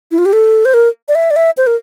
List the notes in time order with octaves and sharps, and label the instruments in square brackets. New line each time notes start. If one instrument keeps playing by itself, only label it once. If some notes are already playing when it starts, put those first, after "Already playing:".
[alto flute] E4
F4
G4
A4
C5
A#4
D5
E5
D5
E5
C5
A#4